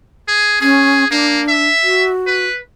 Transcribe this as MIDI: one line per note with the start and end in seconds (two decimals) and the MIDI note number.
0.28 0.57 68
0.61 1.04 61
0.61 1.06 68
1.11 1.42 58
1.11 1.69 62
1.49 2.09 76
1.83 2.45 66
2.26 2.58 71